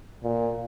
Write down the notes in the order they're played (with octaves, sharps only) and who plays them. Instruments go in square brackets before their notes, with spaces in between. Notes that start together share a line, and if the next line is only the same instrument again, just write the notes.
[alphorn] A#2